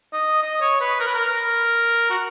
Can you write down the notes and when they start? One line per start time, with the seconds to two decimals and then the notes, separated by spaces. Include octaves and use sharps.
0.13 D#5
0.43 D#5
0.61 C#5
0.81 B4
1.00 A#4
1.07 B4
1.15 A#4
2.10 F#4